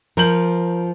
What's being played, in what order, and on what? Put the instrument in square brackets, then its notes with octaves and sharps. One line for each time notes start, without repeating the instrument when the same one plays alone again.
[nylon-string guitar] F3 [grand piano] A#4 G6 F#7